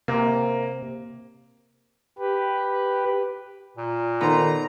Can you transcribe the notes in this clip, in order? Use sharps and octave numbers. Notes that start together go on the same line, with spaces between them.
C3 A#3
G4 B4
A#2
D#3 B3 A4 C5 A#5